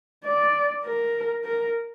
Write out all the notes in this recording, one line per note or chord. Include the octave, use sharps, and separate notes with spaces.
D5
A#4
A#4